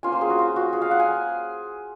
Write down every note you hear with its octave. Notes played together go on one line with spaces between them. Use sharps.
A#3 C#4 F4 G#5
C5
G#4
F#4
F4
F#4
G#4
F5
F#5
G#5